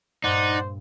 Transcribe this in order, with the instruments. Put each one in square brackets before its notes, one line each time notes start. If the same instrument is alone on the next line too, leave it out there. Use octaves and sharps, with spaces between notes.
[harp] G2 A#2 [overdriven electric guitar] D#4 [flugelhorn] C5 [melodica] D5 F#5